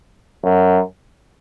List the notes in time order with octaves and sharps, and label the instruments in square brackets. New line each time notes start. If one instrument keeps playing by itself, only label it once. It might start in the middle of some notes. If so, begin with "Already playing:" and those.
[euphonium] F#2